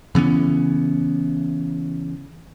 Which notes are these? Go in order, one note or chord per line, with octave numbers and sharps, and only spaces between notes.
C#3 E3 B3 C#4